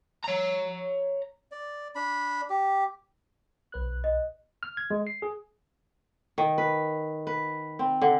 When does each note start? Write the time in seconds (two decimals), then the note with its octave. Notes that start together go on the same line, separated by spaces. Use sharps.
0.24 C#5 A#5
1.51 D5
1.95 D4 B5
2.50 G4
3.72 B1 B4 F#6
4.04 D#5
4.63 F6
4.77 G#6
4.91 G#3
5.07 C7
5.22 G#4
6.38 D#3
6.58 B4
7.27 B4
7.79 C4
8.02 D3